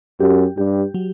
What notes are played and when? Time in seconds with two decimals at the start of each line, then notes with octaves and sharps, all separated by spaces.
0.20 F#2 G4
0.57 G2 G4
0.94 F#3